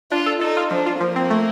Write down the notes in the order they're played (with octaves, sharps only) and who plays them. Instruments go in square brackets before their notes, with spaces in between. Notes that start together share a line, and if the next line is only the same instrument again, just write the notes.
[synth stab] D4 [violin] F4
[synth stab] A4
[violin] D#4 [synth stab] A4
[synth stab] F4
[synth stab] F3 [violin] D4
[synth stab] F4
[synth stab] F3 [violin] A#3
[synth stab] C4
A3